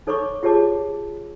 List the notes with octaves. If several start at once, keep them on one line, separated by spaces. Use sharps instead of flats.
D#4 A4 C#5 B5 C#6 D6
F4 G4 G#4 C#5 A5 D6